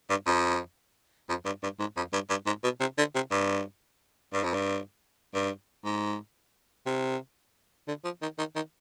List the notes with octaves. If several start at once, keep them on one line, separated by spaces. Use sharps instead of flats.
G2
F2
F2
G2
G2
G#2
F2
G2
G2
G#2
B2
C3
D3
C3
G2
G2
F2
G2
G2
G#2
C3
D3
F3
D#3
D#3
D#3